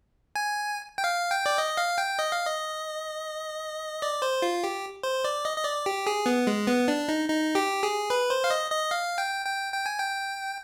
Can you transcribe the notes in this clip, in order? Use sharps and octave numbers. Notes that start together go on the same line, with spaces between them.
G#5
G5
F5
G5
D5
D#5
F5
G5
D#5
F5
D#5
D5
C5
F4
G4
C5
D5
D#5
D#5
D5
G4
G#4
B3
G#3
B3
D4
D#4
D#4
G4
G#4
B4
C5
F5
D#5
D#5
F5
G5
G5
G5
G#5
G5